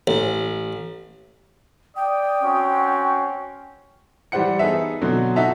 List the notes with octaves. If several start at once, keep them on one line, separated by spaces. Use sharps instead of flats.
A1
D5 G5 D#6
C4 C#4 F#4
E3 G3 G4 C5 F#5 C#7
B3 D#4 G#4 A4 B4 E5
B2 D3 F#3 C4
D#4 F#4 D#5 E5 A5